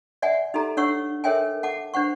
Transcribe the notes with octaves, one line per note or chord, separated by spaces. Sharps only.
D5 E5 F#5 G#5
D#4 G4 A4 A#5
D4 C#5 F#5 C#6 E6
A4 A#4 C#5 E5 G5 G#5
F#5 A5 D6
D4 C5 F#5 C#6